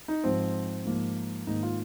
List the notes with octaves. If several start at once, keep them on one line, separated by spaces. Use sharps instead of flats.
D#4
G#2 F3 C4
G#2 F3 A#3
G#2 D#3 A#3 D#4
F4